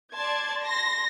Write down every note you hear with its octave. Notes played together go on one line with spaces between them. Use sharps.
D5 A5 C6 G#6
C6 A#6